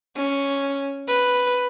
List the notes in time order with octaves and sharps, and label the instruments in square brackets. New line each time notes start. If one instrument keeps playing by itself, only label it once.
[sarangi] C#4
B4